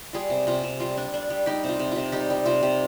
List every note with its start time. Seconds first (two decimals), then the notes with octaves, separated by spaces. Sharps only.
0.13 G3 F4 G#4
0.30 C3
0.47 C3 F4
0.64 C3
0.80 G3 F4
0.97 D4
1.14 D4
1.30 G3
1.46 G3 D#4 G4
1.64 C3
1.69 F4
1.79 C3
1.91 C3 F4
2.12 G3 D#4 G4
2.30 G3
2.46 C3 F4
2.63 C3